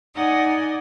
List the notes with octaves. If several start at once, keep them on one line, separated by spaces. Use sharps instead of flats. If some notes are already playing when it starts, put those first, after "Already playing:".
D#4 D5 D#5 F#5 G#5